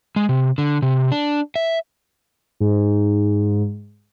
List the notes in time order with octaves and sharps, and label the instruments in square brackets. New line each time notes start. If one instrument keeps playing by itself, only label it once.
[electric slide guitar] G#3
C3
D3
C3
D4
E5
[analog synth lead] G#2